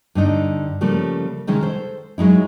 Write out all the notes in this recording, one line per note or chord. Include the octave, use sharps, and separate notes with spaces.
G2 D3 D#4
C#3 F3 G3 A3 A#3
C3 D#3 G#3 C#4
A4 C5
F#3 G#3 D#4 E4